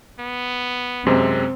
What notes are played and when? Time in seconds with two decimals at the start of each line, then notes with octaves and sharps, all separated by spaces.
0.20 B3
1.06 F#2 C3 G#3 C4